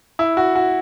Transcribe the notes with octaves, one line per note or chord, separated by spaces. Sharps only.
E4
F#4
F#4